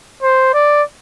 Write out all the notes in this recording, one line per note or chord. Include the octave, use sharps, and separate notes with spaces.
C5
D5